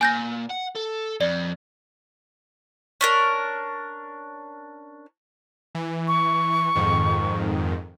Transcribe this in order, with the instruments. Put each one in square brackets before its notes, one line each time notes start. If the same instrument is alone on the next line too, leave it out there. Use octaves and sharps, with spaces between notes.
[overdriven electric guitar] A#2 [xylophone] G#5 G6 A#6
[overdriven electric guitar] F#5
A4
[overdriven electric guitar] F2 [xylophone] D5
[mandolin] C#4 D4 A#4
[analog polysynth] E3
[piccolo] C#6
[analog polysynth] F2 G#2 D#3